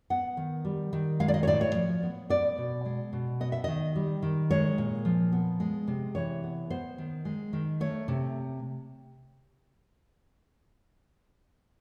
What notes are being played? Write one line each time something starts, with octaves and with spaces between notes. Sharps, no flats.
B3 F#5
D#3
G3
D#3
G#3 F5
D5
D#5
C#5
A2 D5
C#5
F3
B3
B3 D5
B2
G#3
B2
B3 D#5
E5
D#3 D#5
G3
D#3
G#3 C#5
A#2
F3
B3
G#3
C3
E3 C#5
B3
B3 C5
D#3
G#3
D#3
A3 C#5
C3